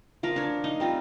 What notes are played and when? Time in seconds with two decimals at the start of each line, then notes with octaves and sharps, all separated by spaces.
0.23 F3 A#4 F5
0.36 D4 C#5
0.64 D#4 D#5 F5
0.80 G3 C4 F4